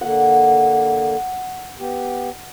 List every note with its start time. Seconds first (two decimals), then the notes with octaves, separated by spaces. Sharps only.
0.01 D3 A#3 F#5
1.79 B3 G4